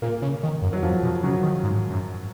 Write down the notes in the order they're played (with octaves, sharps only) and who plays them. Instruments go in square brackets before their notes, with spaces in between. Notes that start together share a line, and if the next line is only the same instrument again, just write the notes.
[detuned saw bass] A#2 [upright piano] A#3
[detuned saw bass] C#3
D#3
F#2
[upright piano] F#3
[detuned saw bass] F2 [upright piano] F3
[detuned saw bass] B2
[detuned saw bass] C#3 [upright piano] F#3
[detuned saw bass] D#3
G#2
F#2